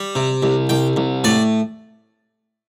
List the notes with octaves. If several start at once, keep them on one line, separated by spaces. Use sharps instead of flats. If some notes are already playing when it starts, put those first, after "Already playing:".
Already playing: G3
C3
C2
C2 G5
C2
A2 D5